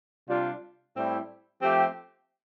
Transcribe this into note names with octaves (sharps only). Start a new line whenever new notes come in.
C3 G3 D4 F4
A2 G3 C4 E4
F3 A3 C4 G4